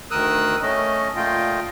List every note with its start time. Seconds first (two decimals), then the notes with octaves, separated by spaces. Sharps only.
0.11 D2 D#3 A#4 D#6 E6 F#6
0.62 A3 C#4 D#5
1.16 A#2 A3 F4 D#5 G5